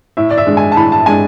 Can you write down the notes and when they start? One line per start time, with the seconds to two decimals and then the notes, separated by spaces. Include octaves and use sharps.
0.17 A2 E5
0.30 D5
0.37 E5
0.46 G#3 D4
0.57 G#5
0.72 A5
0.76 A2 B5
0.92 A5
1.06 G#3 D4 G#5